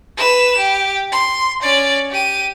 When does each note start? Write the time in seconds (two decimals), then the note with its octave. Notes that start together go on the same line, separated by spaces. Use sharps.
0.17 B4 E7
0.58 G4
1.12 C6
1.62 C#4 D5
2.11 G4 D#7